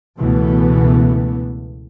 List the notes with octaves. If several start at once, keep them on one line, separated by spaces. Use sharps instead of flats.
C#2 B2 E3 A3 B3